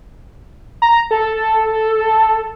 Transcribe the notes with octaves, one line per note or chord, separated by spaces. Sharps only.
A#5
A4